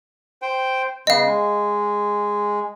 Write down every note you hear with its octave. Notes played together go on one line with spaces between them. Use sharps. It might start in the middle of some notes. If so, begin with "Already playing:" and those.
C5 G5
C#3 B3 D#5 F5
G#3